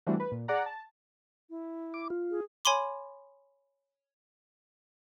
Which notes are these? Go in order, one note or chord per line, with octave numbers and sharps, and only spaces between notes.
E3 G3 A3 C4 D4 F#4
B4
A#2
G#4 D5 F#5 A#5
A5
E4
D6
F4
G#4
C#5 G#5 B5 C6 D6